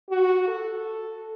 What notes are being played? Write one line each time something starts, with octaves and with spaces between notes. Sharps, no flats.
F#4
A4